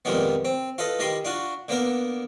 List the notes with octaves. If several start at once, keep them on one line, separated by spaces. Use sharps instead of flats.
F2 A#2 D#3 G3 G#3 B3
C4
F4 A4 B4 D#5
D#3 G3 D#5 B5 C6 D#6
D4 F4 F#4
D3 A#3 B3 A#4